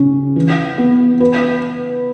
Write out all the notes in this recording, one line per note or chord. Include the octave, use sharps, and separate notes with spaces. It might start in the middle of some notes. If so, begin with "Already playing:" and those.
Already playing: C#3 C#4
E3
B3
B4